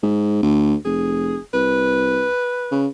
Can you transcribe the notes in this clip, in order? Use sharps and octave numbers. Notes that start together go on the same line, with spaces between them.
G#2
D2
F1 G#4
C2 B4
C#3